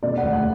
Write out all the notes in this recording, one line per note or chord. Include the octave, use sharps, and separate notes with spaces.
E1 D5
D2 F#5
F#5